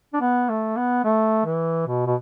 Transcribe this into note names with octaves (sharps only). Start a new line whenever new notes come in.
D4
B3
A3
B3
A3
E3
B2
B2